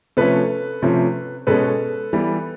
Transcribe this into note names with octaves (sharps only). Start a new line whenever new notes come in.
C3 F3 A3 C#4 A4 B4
C3 F3 A3 C#4
B2 G#3 C#4 A4 B4
E3 G3 B3